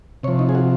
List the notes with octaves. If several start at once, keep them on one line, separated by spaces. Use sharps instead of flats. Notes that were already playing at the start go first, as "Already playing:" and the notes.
C3 F3 C#5
D#4
G#4
F#4